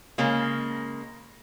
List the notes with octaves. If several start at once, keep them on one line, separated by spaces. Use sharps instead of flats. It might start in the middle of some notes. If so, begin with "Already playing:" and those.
C#3 G#3 A#3